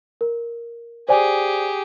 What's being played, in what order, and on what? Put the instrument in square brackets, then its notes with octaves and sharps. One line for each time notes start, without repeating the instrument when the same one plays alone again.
[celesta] A#4
[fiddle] G4 G#4 [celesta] C5 D5 G#5